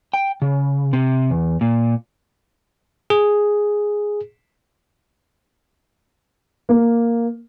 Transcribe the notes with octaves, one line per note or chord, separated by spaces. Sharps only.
G5
C#3
C3
E2
A#2
G#4
A#3